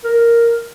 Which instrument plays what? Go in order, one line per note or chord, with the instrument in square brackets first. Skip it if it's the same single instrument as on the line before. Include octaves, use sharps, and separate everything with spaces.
[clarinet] A#4